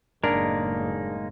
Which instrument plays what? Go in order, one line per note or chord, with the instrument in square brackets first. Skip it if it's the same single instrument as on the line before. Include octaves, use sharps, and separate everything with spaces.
[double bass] F#1 A2 [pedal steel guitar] G#3 A#3 D#4 [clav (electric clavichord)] D4 A#4